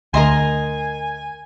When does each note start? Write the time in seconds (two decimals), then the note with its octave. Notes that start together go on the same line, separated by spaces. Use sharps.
0.14 D2 A#4 D#5 G#5 C6